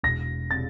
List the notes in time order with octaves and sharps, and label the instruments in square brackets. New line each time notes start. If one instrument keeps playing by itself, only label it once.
[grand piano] E1 A#6
C3 A6